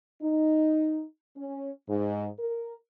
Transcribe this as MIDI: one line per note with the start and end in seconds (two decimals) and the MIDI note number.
0.21 1.03 63
1.37 1.70 61
1.88 2.26 44
2.39 2.74 70